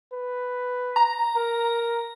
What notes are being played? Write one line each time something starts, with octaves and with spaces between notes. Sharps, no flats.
B4
A#5
A#4